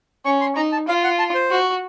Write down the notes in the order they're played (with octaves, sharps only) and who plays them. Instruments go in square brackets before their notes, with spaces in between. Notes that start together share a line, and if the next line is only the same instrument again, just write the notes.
[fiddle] C#4 [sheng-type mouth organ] C#6
[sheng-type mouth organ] C6
[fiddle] D#4 [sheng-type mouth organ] A#5
[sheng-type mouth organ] A5
[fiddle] F4 [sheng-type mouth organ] F5
[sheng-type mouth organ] F#5
A5
C5
[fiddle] F#4